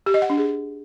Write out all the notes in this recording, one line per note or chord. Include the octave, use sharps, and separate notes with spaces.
G4
D#5
F#5
D4
G#4